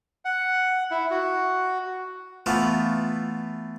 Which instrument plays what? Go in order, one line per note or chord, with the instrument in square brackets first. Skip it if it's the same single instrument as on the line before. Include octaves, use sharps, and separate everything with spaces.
[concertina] F#5
E4
F#4
[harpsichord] E3 A3 B3 F4